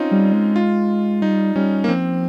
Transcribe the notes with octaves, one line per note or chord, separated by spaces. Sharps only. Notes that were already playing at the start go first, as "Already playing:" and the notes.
Already playing: C4 C#4 D#4 F4
G3
G#3
F4
G3 D#4
G3 C#4
A#3
F3 C4